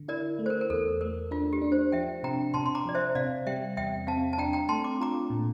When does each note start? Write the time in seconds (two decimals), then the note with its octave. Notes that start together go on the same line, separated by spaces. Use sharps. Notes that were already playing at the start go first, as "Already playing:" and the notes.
Already playing: D3
0.08 E4 A#4 D5
0.39 A3
0.46 C5
0.50 A#4
0.61 A#4
0.70 E2 A4
1.01 A3 A#4
1.31 D4 F4
1.53 G4
1.62 D4
1.72 C5
1.92 F3 E5 G5
2.23 C3 G5 A#5
2.54 C3 A5 C6
2.66 C6
2.75 A#5 D6
2.86 F3 D5
2.95 C5 E5
3.15 C3 D5 F5
3.47 G3 E5 G5
3.77 E2 E5 G5
4.07 C4 F5 A5
4.33 A5
4.38 D4 G5 A#5
4.53 G5 A#5
4.69 A3 A5 C6
4.84 D6
5.00 F4 A#5 D6
5.30 A#2